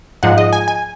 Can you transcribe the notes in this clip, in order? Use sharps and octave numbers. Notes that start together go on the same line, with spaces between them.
G#2 F3 G#3 F#5
D#5
G#5
G#5